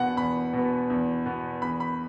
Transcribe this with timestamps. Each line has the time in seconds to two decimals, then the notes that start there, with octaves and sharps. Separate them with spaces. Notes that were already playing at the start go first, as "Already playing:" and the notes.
Already playing: E2 B2 B3 F#5
0.17 E2 B5
0.53 B2 B3
0.90 E2
1.26 B2 B3
1.62 E2 B5
1.80 B5